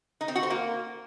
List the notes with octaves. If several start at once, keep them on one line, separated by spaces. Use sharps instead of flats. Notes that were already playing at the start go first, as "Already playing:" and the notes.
D#4
C4
F#4
C5
A#3